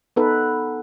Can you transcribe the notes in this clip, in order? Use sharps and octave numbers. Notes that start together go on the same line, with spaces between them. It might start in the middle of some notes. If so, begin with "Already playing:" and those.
B3 D#4 A4 B4